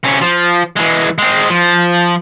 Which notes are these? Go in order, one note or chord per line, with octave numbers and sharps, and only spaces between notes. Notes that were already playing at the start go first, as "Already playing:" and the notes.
C3 C#4
F3
E3 G#3
G#3 C4
F3